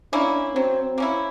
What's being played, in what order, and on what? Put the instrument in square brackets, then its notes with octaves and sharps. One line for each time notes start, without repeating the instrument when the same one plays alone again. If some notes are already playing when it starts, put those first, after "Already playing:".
[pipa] A#3 C#4 E4 [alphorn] D4
[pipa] F#3 [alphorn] C4
[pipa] A#3 C#4 E4